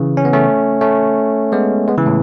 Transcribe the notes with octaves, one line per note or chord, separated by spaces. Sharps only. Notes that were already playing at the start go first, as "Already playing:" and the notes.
Already playing: C#3 E3
C#4
B3
A3 C#4
A3 C#4
G#3 B3
G#3 B3
C#3 E3
A2